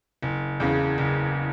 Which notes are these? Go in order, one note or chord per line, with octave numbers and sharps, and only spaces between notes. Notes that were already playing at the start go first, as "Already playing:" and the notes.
F#1
E2 C#3
F#1